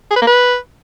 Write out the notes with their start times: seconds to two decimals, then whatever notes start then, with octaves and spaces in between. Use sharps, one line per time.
0.11 G#4
0.16 B4
0.22 A#3
0.27 B4